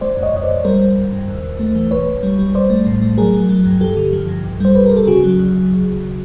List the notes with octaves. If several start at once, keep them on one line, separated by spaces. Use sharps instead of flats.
G#3 C5 D5
F2
C#5 D#5
F2 D#5
C5 D5
F2
G3 A#4 C5
G#1
G#1
G2
D#2
D#2
A3
E3
B1 B4 C#5
B1
G3
G3
A#1 C5 D5
A3
A2
A3
F#3 G#4 A#4
F#3
F#3
G2
G2 G4 A4
D3
F3
G2
B1
G3 C5
B1 B4
A#4
B1 A4
C#3 F#4 G#4
F#3
D2